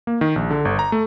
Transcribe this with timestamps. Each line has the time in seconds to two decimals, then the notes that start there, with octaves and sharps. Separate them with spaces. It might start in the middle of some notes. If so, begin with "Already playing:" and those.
0.07 A#3
0.21 D#3
0.36 A#1
0.50 D3
0.65 G1
0.79 A#5
0.92 A3